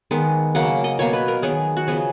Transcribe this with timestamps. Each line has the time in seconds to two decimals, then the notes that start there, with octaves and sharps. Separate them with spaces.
0.11 D#3 G#3 B3
0.55 C#3 F#3 A#3 F#5
0.84 D#5
0.99 B2 A#3 C#5
1.13 B4
1.28 A#4
1.42 D#3 F#3 B3 G#4
1.77 F#4
1.87 C#3 F3 B3 G#4